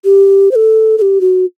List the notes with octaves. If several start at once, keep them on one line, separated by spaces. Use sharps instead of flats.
G4
C5
A4
A4
G4
F#4